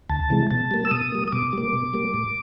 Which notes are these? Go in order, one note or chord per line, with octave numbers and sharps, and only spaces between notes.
D2 A5
C3 E3 G#3
B2 A5
G3 A#3
E6
B2 D#6
G3 A#3
D#6
B2 D6
G3 A#3
B2
G3 A#3
A2